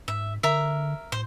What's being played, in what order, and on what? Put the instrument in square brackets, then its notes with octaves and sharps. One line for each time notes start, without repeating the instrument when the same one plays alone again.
[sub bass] G#2 [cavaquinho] E5
[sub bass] D3 [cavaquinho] A#4 E5
[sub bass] A2 [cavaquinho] C5